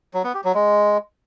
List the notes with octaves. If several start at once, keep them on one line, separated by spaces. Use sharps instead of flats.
F#3
B3
G4
F#3
G#3